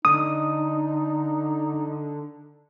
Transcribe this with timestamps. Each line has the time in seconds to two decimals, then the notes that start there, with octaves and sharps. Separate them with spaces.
0.05 D3 D#4 D#6